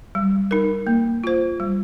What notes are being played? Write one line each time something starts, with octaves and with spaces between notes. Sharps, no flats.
G3
D#4 A#4
A#3
F4 C5
G3